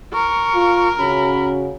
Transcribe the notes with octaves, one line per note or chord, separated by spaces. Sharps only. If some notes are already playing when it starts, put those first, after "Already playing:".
A#4 C#6
F4
C#3 C#4 F#4 B5